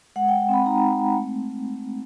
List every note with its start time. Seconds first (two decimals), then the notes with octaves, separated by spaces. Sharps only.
0.16 G#3 F#5
0.28 G5
0.33 G#3
0.49 C4 B5
0.66 D#4 A#5
0.83 G#3
0.91 B5
0.99 C4
1.16 A3